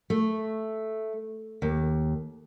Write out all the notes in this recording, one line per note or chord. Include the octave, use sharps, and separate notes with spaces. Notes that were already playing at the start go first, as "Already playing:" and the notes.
A3
D#2